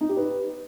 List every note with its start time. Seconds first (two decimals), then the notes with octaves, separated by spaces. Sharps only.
0.01 D#4
0.09 G4
0.17 B4